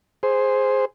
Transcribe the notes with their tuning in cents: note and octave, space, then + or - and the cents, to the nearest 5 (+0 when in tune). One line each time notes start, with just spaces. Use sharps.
G#4 +0 C5 +0